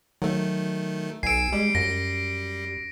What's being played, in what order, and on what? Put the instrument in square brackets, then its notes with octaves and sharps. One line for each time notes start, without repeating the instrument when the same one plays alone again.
[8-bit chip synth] D#3 A3 [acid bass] F#3
[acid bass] B1 [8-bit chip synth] G#5 E6 [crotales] C7 D7
[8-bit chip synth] G3 [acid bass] G#3
[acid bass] F#2 [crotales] A#6